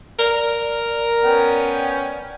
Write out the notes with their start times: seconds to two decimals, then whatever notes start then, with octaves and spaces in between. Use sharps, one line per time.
0.19 A#4 D5
1.23 B3 C#4 G5